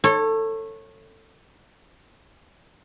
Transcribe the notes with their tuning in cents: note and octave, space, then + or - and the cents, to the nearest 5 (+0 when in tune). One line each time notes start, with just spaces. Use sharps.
A4 +20 C#5 -20